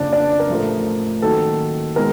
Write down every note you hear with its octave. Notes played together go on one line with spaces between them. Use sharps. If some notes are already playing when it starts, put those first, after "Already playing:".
Already playing: F#1 F2 C#3 D4 D5
D4 D5
A#4
A1 A2 F3 A3
F#2 D#3 F#3 A#3 A4
D#3 G#3 B3 A#4